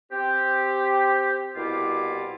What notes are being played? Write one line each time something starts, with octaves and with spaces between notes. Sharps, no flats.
C4 G4
C2 B2 E4 F4 D6